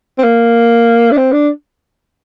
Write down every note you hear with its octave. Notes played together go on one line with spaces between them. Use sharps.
C4
A#3
D4
C4
D4